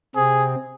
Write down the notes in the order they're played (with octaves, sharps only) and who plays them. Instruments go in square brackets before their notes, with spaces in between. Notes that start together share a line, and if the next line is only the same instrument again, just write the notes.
[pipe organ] C3 C4 [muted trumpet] G#4